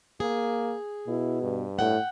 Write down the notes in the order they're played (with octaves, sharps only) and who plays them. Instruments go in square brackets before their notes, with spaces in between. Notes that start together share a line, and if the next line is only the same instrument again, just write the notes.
[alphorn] A#3 [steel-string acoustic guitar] G#4
[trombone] B2 [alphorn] E4
[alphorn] G2
[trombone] A2 [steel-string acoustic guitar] F#5 G5